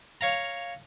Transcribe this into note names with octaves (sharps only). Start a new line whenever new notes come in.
C#5 F5 A#5